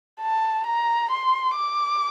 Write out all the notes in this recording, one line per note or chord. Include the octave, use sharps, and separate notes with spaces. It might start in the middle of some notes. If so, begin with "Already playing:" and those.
A5
A#5
C6
D6